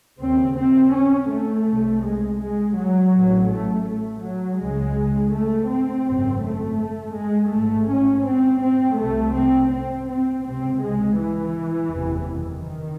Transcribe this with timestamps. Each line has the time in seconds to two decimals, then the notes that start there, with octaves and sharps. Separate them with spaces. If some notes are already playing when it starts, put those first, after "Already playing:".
0.20 D#2 C#3 C4
0.57 C4
0.93 C#4
1.30 A3
1.67 C2 C3
2.03 G#3
2.40 G#3
2.76 F#3
3.13 A1 A2
3.50 A3
3.86 A3
4.23 F#3
4.59 C#2 C#3 G#3
5.32 A3
5.69 C4
6.05 G#1 F#2 C#3
6.42 A3
7.15 G#3
7.51 A1 G#2 A3
7.88 C#4
8.24 C4
8.61 C4
8.97 C2 C3 A3
9.34 C4
9.71 C4
10.08 C4
10.44 C#2 C3 C4
10.81 G#3
11.17 E3
11.90 F#1 E2 C3
12.27 D#3